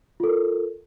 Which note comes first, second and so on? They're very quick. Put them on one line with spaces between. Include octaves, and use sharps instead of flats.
F4 A4 A#4